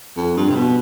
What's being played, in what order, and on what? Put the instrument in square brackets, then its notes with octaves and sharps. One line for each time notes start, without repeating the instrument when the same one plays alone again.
[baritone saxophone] F2
G2
C3
B2